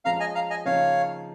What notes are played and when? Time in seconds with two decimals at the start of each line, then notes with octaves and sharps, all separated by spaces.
0.05 F3 G#3 C#4 F5 A#5
0.20 D#5 G#5
0.35 F5 A#5
0.50 D#5 G#5
0.65 C#3 F3 A#3 D#4 C#5 F5